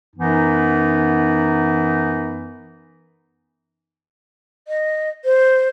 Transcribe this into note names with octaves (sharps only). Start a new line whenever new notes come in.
F#2 E3 B3 D#4
D#5
C5